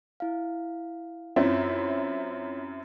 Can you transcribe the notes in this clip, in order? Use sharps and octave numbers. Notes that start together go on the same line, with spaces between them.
E4 F5
F#2 C4 E4 F4 C#5 A6